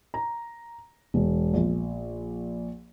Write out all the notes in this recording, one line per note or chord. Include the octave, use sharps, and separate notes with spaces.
A#5
E1
A#1